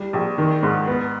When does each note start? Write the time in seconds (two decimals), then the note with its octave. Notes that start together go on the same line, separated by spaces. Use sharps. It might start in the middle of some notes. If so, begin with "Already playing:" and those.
Already playing: G3
0.13 A#1
0.38 D#3
0.63 G#2
0.87 B3